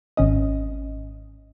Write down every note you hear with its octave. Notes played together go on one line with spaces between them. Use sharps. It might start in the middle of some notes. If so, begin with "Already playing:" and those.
G#1 C#4 D#5